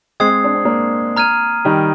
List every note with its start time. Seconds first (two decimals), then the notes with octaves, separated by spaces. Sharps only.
0.20 G#3 C4 D#6 G#6 C7
0.44 D4
0.54 C4
0.65 A#3 D4
1.16 A#5 F6 G#6 D#7
1.65 D#3 G3